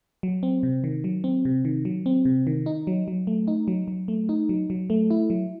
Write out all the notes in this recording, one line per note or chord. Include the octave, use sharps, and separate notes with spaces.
F#3
C4
C3
D#3
F#3
C4
C3
D#3
F#3
C4
C3
D#3
D#4
F#3
F#3
A3
D#4
F#3
F#3
A3
D#4
F#3
F#3
A3
E4
F#3